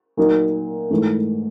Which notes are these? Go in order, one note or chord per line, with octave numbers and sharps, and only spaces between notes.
A#2 F#3 A#3 D#4
G#2 E3 A3